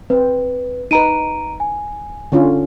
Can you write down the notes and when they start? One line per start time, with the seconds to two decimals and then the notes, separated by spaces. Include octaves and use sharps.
0.10 C4 B4
0.91 D#4 B4 A#5 D7 D#7
1.60 G#5
2.32 D3 C#4 F4